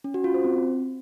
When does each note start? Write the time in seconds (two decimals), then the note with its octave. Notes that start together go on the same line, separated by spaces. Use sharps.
0.04 C#4
0.14 F#4
0.24 F4
0.34 C5
0.44 C4